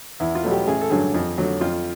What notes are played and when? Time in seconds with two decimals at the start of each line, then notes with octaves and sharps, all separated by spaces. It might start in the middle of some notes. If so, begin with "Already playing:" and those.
0.20 E2 E4
0.35 F4
0.43 B2 F#3 A3
0.51 G4
0.67 A1 G#4
0.81 A4
0.90 G2 D3 F#3 G#4
1.14 F2
1.37 D3 F#3 A3
1.61 F2 F4